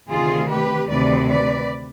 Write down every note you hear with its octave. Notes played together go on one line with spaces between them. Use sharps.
D2 C3 D#3 F4 G#4
G4 B4
D2 C3 D#3 B4 D5
B4 D5